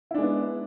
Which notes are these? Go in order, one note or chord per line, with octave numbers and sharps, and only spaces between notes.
G#3 B3 D4 E4